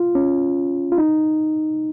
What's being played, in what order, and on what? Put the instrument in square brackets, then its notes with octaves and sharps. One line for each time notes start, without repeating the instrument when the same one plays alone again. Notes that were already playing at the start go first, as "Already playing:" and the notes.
Already playing: [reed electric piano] F4
C#4
F4
D#4